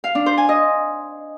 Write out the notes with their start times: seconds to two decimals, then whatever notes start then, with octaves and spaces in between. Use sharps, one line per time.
0.04 F5
0.15 D4
0.26 C5
0.38 G#5
0.49 D#5